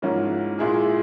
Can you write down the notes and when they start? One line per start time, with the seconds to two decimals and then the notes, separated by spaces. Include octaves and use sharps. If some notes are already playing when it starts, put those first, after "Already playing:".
0.02 G#2 F3 A#3 C#4 E4
0.59 A#2 G#3 E4 G#4